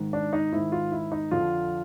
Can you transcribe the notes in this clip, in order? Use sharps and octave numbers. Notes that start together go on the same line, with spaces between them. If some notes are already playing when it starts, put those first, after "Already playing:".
Already playing: G#2 D#3
D4
D#4
G#2 D#3 E4
F4
E4
D#4
F2 D3 F3 F4